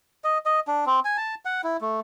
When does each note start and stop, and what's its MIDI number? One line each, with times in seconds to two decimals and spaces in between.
0.24 0.38 75
0.46 0.60 75
0.68 0.85 62
0.86 1.00 60
1.05 1.17 80
1.17 1.35 81
1.45 1.61 78
1.64 1.77 64
1.81 2.00 57